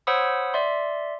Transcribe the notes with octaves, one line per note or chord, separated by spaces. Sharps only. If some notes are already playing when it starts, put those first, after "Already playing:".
C5 C#5 F#5 B5 D#6 E6
D5 E5 C6